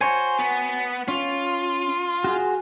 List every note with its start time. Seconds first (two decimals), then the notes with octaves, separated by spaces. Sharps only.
0.01 F#4 C5 C#5 G#5
0.39 B3
1.08 C#4 F4
2.24 F#4 G#4